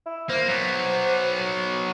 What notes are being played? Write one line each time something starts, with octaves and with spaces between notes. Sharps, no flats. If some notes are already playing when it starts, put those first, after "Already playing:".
E4
A#3 C5
F#3 B3